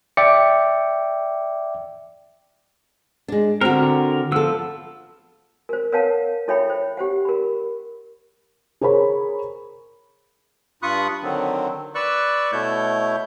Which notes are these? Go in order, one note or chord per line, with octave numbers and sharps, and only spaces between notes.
D5 E5 G5 D6 C#7
G#3 D4
D3 C4 F#4 A#4
F3 B3 A4 E6
A#4 C5
A#4 B4 C#5 F5 F#5 A5
E4 A4 C#5 E5 G5 B5
C5
G4 C5 F#5
A#4 B5
G#4 A#4 C5 C#5 B5
G2 F4 B5 C#6 D#6 F#6
D3 D#3 F#3 C4
B4 D5 C#6 E6 F#6
B2 A3 E4 C#5 G6